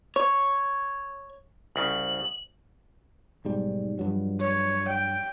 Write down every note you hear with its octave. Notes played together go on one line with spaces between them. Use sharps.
C#5
C2 C#3 F#7
B1 G#2 G3
G2 F3 F#3
C#5
G5